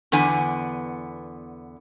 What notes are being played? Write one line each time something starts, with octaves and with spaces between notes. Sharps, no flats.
E2 D3 B3 G#5